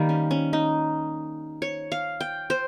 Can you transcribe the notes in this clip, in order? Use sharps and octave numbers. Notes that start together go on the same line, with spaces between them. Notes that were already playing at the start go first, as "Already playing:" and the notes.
Already playing: D#3 G3 A#3
C#4
C#4
D#4
C#5
F5
G5
C5